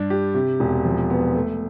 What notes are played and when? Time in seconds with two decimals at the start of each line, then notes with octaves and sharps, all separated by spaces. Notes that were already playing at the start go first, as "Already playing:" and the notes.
Already playing: G2 D4
0.10 G4
0.34 C3
0.60 E1
0.85 F3
1.10 B3
1.35 A3